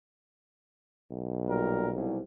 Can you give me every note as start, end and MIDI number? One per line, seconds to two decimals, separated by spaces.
1.11 2.21 35
1.48 1.88 46
1.48 1.88 55
1.48 1.88 70
1.94 2.19 36